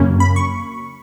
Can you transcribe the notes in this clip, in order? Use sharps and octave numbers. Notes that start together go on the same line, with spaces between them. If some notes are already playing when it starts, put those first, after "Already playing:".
Already playing: F#2 C#3 F#3 A#3 C#4
B5
C#6